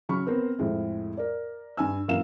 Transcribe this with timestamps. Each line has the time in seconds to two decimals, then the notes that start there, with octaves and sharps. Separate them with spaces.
0.09 C#3 F#3 B5 C#6 F6
0.27 B3 C4 A#4 C5
0.59 F2 A2 G#3
1.17 A#4 D5
1.77 G2 G#5 E6
2.08 F#2 A#2 E3 F5 E7